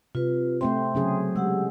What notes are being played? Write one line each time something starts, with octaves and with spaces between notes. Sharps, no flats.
C3 F4 B4
A3 C4 C5 E5 G5 C6
C#3 F#3 C#4 G#4
G#3 G4 F#5 E6